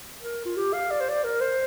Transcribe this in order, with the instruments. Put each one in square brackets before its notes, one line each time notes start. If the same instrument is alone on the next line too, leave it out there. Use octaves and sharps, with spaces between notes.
[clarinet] A#4
F4
G4
F5
D5
C5
D5
A#4
C5